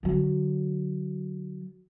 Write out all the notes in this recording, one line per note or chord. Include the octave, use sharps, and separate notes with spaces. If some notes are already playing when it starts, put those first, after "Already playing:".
D3 F#3